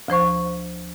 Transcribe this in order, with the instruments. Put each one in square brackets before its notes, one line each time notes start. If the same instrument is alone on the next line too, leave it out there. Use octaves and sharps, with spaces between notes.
[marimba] D2 F3 C5 C#6